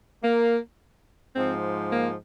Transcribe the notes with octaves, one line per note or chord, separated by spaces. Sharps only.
A#3
G#2 F3 C4
A#3